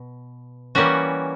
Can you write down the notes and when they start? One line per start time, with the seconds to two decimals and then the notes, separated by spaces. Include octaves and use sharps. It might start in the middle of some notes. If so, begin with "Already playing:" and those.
Already playing: B2
0.75 E3 G3 A#3 C#4 F#4